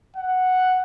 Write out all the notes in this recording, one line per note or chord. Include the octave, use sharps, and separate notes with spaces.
F#5